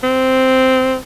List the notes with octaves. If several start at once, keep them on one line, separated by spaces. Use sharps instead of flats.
C4